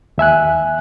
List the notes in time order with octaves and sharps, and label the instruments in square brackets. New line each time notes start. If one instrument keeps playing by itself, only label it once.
[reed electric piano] D#2 E5 G#5 F#6